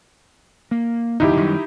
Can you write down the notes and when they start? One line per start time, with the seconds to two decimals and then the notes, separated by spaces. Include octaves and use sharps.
0.71 A#3
1.20 F#1 D#2 G#2 D#4 E4 G4
1.37 F#2 D#3 G3